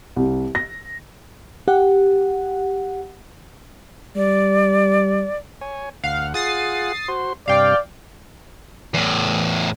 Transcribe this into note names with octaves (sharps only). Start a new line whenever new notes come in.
C2
A#6
G4 F#5
G3 D5
C#5 G#5
D2 F5 F#5
F4 G#4 F#5 D#6 A6 C7
F#4 C5 C6
G2 C3 D5 F5 G5
E2 A2